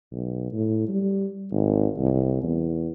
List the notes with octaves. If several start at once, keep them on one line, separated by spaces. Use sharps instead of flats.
B1
A2
G3
G#1
C2
E2